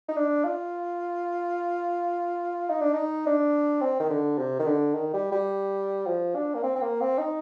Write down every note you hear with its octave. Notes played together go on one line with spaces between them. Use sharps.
D#4
D4
F4
D#4
D4
D#4
D4
C4
D#3
D3
C3
D#3
D3
D#3
G3
G3
F3
D4
A#3
C4
C4
A#3
C4
D#4